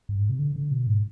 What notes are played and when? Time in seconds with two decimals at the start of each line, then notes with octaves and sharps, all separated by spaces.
0.09 G2
0.19 G#2
0.30 C3
0.39 D3
0.56 D3
0.71 B2
0.87 G#2